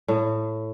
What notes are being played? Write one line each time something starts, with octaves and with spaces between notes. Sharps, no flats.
A2